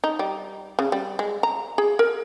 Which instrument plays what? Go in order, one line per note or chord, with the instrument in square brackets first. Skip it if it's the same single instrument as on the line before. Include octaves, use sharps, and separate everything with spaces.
[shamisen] D#4
G3
C#3
G3
G#3
A#5
G#4
A#4